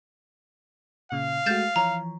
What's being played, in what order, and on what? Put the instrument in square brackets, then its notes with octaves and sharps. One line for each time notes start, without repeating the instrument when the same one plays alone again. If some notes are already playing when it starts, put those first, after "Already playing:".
[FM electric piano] A#2 C#3 [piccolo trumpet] F5
[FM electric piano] G#3 A3 F#4 [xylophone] G6 A6 E7
[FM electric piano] E3 F3 C#5 [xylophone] A#5